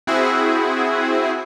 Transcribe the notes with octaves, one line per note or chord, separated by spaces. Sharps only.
C4 E4 F#4 G#4